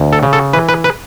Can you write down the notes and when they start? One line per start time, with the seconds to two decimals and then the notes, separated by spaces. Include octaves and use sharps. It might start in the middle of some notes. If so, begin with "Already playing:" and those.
Already playing: D2
0.13 A4
0.23 C#3
0.33 A4
0.53 E3 B4
0.69 B4
0.84 B4